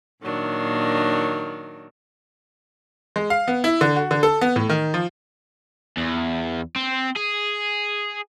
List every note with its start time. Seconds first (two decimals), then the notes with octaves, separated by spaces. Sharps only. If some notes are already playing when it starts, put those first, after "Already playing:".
0.22 A#2 D#3 F#3 D4
3.16 G#3
3.30 F5
3.48 B3
3.64 E4
3.81 D3
3.96 F#4
4.11 D3
4.23 A4
4.41 B3
4.56 A2
4.69 D#3
4.94 F3
5.97 E2
6.76 C4
7.16 G#4